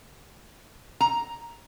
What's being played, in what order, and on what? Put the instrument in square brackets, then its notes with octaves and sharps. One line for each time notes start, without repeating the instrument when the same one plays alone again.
[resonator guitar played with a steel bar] A#5